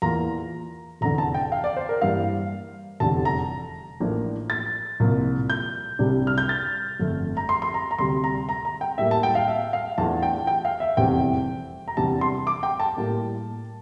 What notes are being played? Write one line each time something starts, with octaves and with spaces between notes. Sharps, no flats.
E2 E3 A#3 F4 A#5
F1 E2 D3 A#5
A5
G5
F5
D5
C5
A#4
G2 E3 G3 A#3 F5
F1 E2 D3 G3 A5
A#5
A1 A2 F3 A#3 D4
A6
C2 A#2 F3 A#3
G6
C2 C3 G3 D4
F6
G6
A6
G1 F2 D3 F3 A3
A#5
C6
C6
A#5
A#5
D2 C3 G3 C6
A#5
A#5
A#5
G5
A2 G3 A#3 E5
A5
G5
F5
E5
F5
E2 E3 A3 D4 F4 A5
G5
G5
F5
E5
F1 E2 E3 G3 C4 G5
A#5
E2 C3 G3 D4 A5
C6
D6
G5
A5
A2 G3 A#3